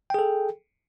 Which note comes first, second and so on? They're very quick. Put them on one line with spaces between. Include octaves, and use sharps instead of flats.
G5 G#4 A4